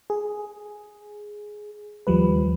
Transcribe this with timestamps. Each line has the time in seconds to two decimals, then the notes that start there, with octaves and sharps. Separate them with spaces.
0.10 G#4
2.07 D#2 F3 G3 B4